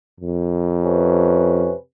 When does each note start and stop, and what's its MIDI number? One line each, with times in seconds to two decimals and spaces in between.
0.20 1.71 41
0.84 1.74 48
0.84 1.74 61
0.84 1.74 71